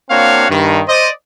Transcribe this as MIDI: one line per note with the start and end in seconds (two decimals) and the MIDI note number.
0.10 0.47 58
0.10 0.47 60
0.10 0.47 62
0.10 0.47 66
0.10 0.47 73
0.10 0.47 77
0.50 0.82 43
0.50 0.82 51
0.88 1.10 72
0.88 1.10 74
0.88 1.10 75